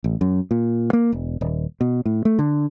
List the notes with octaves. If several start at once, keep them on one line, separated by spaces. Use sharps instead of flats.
A1
F#2
A#2
A#3
E1
D#1
B2
A2
A3
D3